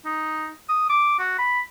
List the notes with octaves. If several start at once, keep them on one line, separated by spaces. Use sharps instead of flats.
D#4
D#6
D6
F#4
B5